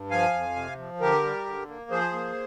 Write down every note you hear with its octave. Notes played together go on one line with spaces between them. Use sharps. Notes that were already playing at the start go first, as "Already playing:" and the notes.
Already playing: G2
F3 F5 G#5
F2
C3
F3
D3 G4 A#4
G3
D3
A#3
F3 G#4 C5
A#3